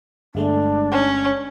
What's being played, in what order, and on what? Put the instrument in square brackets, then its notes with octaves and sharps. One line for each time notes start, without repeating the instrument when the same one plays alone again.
[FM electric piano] G1 G#3 A3 [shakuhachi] D4
[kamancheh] C#4